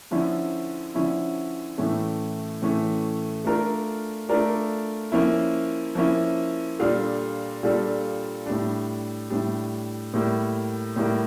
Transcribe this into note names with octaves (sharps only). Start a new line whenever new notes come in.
D3 F3 C#4 E4
D3 F3 C#4 E4
A2 E3 A3 C#4
A2 E3 A3 C#4
A3 D4 F4 A#4 D5
A3 D4 F4 A#4 D5
F3 A#3 C#4 E4
F3 A#3 C#4 E4
A#2 G3 D4 F4 A4
A#2 G3 D4 F4 A4
A2 G3 D4
A2 G3 D4
A2 G3 A#3
A2 G3 A#3